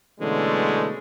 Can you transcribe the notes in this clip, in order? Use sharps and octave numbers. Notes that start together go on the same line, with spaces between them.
B2 D3 E3 G#3 A3 C#4